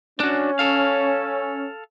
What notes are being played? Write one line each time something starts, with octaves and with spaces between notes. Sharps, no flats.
C#4 D4 F#4
A4 F5